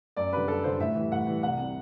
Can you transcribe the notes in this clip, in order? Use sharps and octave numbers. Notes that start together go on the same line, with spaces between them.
F#2 D5
D3 G3 B4
F#2 A4
D3 G3 C5
A2 E5
E3 G3
A2 F#5
E3 G3
C2 F#5
C3 G3